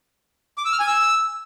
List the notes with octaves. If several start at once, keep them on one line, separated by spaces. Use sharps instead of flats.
D6
E6
F6
G#5
E6